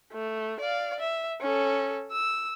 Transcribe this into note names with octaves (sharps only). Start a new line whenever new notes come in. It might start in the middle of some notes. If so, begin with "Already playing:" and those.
A3
D5 F5
E5
C#4 A4
E6